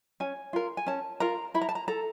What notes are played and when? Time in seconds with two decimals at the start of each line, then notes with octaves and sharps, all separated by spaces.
0.20 C#4 G#5
0.53 F4 A#4
0.77 G#5
0.87 C#4 A5
1.20 F4 A#4 A#5
1.54 E4 B5
1.62 A#5
1.69 A5
1.75 A#5
1.88 A4 A#5